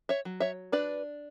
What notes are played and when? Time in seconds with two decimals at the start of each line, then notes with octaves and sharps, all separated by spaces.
0.09 C#5 E5
0.25 F#3
0.40 C#5 E5
0.72 D4 B4 D5